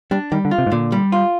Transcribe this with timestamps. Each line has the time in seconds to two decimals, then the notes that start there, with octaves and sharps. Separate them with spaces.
0.11 G3 D4
0.32 D#3 G3
0.45 D3
0.51 F4
0.58 C3
0.66 G#2
0.72 A#2 D3
0.92 G3
1.12 F4